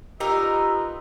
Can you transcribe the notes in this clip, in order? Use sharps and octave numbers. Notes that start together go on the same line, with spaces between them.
D#4 F4 G4 A#4 B4 D#5 E6